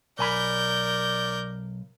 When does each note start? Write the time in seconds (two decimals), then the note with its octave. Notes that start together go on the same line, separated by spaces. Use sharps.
0.19 B1 A#4 D5 G#5 B5 G6